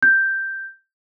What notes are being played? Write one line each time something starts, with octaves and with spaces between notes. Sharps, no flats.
G6